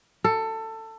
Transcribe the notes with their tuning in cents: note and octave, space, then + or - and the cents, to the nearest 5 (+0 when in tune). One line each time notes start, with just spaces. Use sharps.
A4 +20